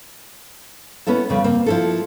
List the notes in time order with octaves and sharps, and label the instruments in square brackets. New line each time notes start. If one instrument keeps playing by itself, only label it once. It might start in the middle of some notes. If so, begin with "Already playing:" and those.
[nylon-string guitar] B3 C#4 E4 A4
F2 C#3 G3
A#3 C4
F3 E4 A4